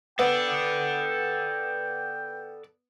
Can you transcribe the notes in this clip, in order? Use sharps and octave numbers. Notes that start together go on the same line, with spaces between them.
B3 A4 D5 G5